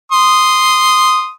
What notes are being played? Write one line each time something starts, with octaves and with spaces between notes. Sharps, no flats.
C6 D#6